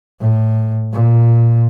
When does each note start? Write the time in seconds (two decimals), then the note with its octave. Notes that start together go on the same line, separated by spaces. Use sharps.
0.21 A2
0.93 A#2